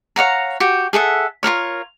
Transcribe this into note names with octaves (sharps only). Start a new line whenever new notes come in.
C#5 F5 F#5 A#5
F#4 G4 G5
G#4 A4 E5 F#5
F4 A4 A#4 C#5